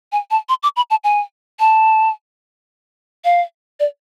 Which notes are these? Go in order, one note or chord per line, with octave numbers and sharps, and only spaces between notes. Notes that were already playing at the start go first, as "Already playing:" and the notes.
G#5
A5
C6
D6
B5
A5
G#5
A5
F5
D5